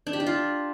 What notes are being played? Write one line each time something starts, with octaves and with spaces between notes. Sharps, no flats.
D4
G4
D4
F4